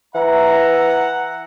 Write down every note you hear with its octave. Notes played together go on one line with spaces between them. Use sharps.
E3 E5 F#5 A#5